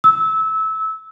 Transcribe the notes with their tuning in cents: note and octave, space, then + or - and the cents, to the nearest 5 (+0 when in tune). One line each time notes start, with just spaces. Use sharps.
E6 -20